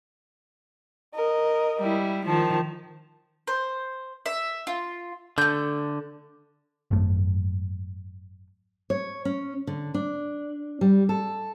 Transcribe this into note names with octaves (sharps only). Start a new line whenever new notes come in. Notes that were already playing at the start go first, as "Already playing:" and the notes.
A#4 D#5
G3 E4
D#3 F3 A5
C5
E5
F4
D3 A3 G6
G#1 F#2 A3
C#5
C#4
D3
D4
G3
A4